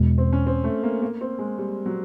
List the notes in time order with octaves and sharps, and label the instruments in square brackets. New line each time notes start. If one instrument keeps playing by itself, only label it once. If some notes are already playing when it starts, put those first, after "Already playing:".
Already playing: [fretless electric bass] E2 B2 G#3
[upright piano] C4
C#4
C4
A3
A#3
A#3
C4
G#3
G3
F#3